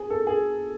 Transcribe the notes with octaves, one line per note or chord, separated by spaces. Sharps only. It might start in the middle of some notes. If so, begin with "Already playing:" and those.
Already playing: G#4
A4
G#4